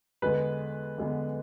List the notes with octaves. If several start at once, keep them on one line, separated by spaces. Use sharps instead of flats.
E2 D3 G#3 B3 B4
E2 D3 G#3 B3